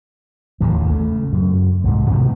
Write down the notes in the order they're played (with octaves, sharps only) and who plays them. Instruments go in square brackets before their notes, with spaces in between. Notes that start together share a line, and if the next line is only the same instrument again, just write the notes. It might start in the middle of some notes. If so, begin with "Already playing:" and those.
[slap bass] A1 D#2 A2 F3
C#3 A3
F#2
C2 G#2
A1 B2 D3 D#3